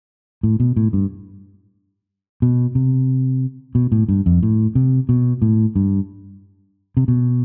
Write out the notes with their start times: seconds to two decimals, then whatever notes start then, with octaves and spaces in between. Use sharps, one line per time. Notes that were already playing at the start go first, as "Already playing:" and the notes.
0.43 A2
0.60 B2
0.76 A2
0.93 G2
2.42 B2
2.75 C3
3.75 B2
3.92 A2
4.09 G2
4.26 F2
4.43 A2
4.75 C3
5.09 B2
5.42 A2
5.76 G2
6.97 C3
7.08 B2